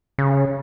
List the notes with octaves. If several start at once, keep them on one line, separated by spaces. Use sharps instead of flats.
C#3